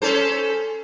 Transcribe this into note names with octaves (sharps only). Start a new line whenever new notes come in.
C#4 A4 C5